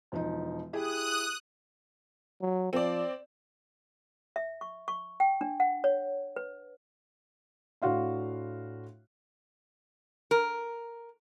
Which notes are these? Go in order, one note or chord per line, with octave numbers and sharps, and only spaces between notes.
E1 F3 D#4
E4 G4 G#4 D#6 F#6
F#3
F3 C4 D5
E5
C#6
C#6
G5
D4
F#5
C#5
B4
A2 D4 F#4 F5 C6
A#4